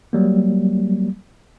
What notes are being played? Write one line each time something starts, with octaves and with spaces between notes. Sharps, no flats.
F#3 G3 A#3